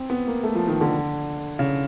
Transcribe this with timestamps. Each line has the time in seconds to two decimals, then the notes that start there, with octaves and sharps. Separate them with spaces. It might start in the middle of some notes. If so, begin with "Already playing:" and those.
Already playing: C4
0.10 B3
0.27 A#3
0.43 A3
0.55 F3
0.68 D#3
0.81 D3
1.59 C#3